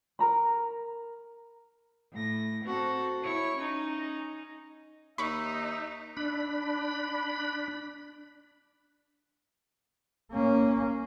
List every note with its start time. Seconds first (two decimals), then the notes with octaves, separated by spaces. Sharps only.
0.19 A#4 A#5 B5
2.13 A2 A#6
2.66 C4 F#4 A4 F#5
3.23 E4 C#5 C#6 G#6
3.57 C#4 D#4
5.18 D#2 D#4 E5 B5 C#6
6.17 D4 B5
10.32 A#3 C#4